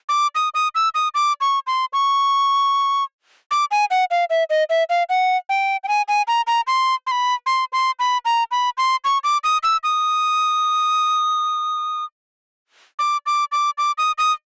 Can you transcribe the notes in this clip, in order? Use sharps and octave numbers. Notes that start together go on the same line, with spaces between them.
D6
D#6
D#6
E6
D#6
D6
C#6
C6
C#6
D6
G#5
F#5
F5
E5
D#5
E5
F5
F#5
G5
G5
G#5
G#5
A#5
A#5
C6
C6
B5
C6
C6
B5
A#5
B5
C6
C#6
D6
D#6
E6
D#6
D6
D6
D6
D6
D#6
D#6